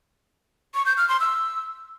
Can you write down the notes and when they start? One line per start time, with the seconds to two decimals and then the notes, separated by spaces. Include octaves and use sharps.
0.75 C#6
0.86 G6
0.97 F6
1.09 C6
1.20 E6